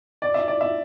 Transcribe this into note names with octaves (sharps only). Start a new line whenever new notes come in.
D5
E5
D5
E5